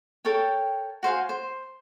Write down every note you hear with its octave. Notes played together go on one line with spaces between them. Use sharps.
A4 A#4 C#5 G5
F#4 C5 F5 G#5
C5